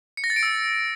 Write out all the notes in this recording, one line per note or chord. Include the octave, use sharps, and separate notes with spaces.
C#7
A#6
A6
D7
E6